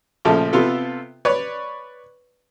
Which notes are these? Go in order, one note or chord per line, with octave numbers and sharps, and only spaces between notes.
A#1 C#3 F3 A3
C3 B3 F4 A4
B4 C#5 D5 C#6